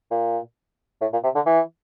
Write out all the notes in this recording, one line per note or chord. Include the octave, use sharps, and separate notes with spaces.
A#2
A2
A#2
C3
D3
E3